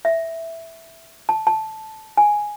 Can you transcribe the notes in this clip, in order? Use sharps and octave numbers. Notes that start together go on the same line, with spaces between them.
E5
A5
A5
G#5